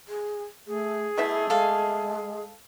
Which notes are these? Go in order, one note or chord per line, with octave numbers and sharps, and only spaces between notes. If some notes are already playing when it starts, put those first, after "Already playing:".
G#4
A3 G#4
B2 A3 E4 E5
G#3 A4 F5